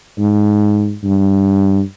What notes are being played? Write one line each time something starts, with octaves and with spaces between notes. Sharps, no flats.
G#2
G2